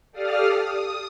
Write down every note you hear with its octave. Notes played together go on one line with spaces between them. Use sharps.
G4 A4 D5 F5 D#6 F6
D#6